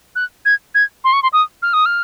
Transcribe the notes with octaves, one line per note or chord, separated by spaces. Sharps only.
F#6
G#6
G#6
C6
C#6
C6
D#6
F6
D#6
F6